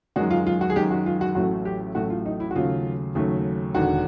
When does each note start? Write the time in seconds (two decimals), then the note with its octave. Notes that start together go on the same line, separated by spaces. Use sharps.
0.16 F#2 D#3 G#3 F#4
0.30 F4
0.46 F4
0.61 F#4
0.70 G#4
0.76 F#2 D#3 G#3 G4
0.91 F#4
1.06 F4
1.21 F#4
1.35 A1 A2 F#3 A3 F#4
1.65 G4
1.95 A1 A2 F#3 A3 F#4
2.10 F4
2.26 D#4
2.40 E4
2.51 F#4
2.55 D#2 C#3 F#3 A3 F4
3.15 D#2 C#3 F#3 A3
3.74 E1 D#2 D3 F#4